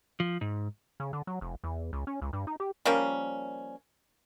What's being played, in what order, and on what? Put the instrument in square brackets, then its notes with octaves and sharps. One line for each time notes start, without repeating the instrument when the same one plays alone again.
[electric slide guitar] F3
G#2
[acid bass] C#3
D3
F#3
F1
E2
C#2
C#4
C#2
G2
D#4
G4
[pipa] F3 G3 A#3 C#4